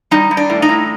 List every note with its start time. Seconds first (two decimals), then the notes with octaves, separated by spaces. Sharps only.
0.11 G3 D#4
0.31 G3
0.37 D4
0.50 A2
0.62 D#4
0.69 A2